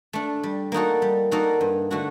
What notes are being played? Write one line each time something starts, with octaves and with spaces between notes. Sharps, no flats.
A3 D4
G3
A#3 D#4 F#4 A4
G3
A#3 D#4 F#4 A4
G2
D3 A3 D4 F#4